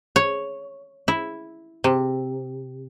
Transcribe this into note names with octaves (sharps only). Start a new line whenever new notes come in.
C#5
E4
C3